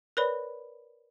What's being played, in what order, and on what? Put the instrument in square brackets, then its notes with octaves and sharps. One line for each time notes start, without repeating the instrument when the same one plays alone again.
[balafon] A#4 B4 C#5 D5 B5